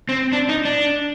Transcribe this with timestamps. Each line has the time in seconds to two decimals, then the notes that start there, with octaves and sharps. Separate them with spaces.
0.09 C4
0.33 D4
0.49 D#4
0.65 D4